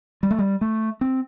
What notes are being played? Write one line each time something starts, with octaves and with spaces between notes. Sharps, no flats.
G3
A3
G3
A3
C4